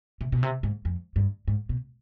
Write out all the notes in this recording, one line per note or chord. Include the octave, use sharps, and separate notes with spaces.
C3
B2
C3
G#2
F2
G2
G#2
B2